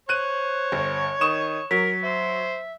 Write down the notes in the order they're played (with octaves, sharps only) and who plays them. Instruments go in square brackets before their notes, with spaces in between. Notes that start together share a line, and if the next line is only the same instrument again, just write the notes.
[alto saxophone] C5 [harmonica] C#5 [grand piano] F#6 D#7
[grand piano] G1
[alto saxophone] D#3 [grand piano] C#6 D#6 E7
[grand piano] F#3 [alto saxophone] A#4 [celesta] B6
[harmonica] C5 [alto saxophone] E5